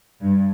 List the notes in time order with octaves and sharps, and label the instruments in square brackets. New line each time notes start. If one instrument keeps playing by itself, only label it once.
[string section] G2